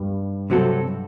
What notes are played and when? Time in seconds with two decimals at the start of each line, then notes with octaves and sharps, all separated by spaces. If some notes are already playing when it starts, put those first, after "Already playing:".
Already playing: G2 G3
0.50 C3 F#3 C4 F#4 A4